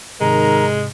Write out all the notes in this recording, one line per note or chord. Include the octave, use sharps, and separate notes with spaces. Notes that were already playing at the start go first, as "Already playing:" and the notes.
G#2 C3 D#3 G#3 A#4 A#5